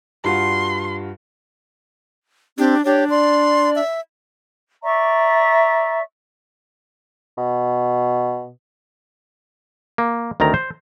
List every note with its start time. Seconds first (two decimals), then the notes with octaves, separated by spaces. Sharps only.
0.24 G2 F4 F#4 C6
2.58 C4 D4 G4
2.85 D4 G4 C#5
3.10 D5 C6
3.75 E5
4.83 D5 E5 A#5 C#6
7.37 B2
9.98 A#3
10.40 D2 D#3 C4 A#4 A#5
10.54 C5